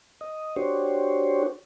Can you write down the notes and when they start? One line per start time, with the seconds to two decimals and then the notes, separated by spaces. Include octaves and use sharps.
0.21 D#5
0.56 D4 F#4 G4 C5 C#5